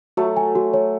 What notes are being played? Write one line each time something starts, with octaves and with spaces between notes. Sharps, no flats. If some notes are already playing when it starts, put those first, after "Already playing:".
F#3 A3 F#4
G#5
F#4
C#5